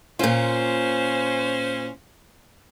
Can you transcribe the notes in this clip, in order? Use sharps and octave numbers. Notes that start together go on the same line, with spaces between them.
A#2 C#4 F4 C5